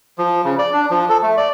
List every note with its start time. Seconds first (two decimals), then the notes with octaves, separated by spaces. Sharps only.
0.18 F3
0.45 C#3
0.58 D5
0.73 D4
0.90 F3
1.09 A4
1.23 A3
1.37 D5